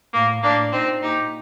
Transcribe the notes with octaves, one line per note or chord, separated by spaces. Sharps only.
A2 A#3
A2 A#3 D4
A#2 C4 D#4
A#2 D#4 G4